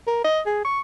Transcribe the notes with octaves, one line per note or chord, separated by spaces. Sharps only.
A#4
D#5
G#4
C#6